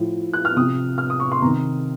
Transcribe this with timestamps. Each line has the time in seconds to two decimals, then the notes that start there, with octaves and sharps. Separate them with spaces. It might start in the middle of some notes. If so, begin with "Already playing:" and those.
Already playing: A2 F3
0.33 F#6
0.45 F6
0.57 C3 F3 D#6
0.98 F6
1.10 D#6
1.20 C#6
1.32 C6
1.42 C3 A#5
1.45 D#3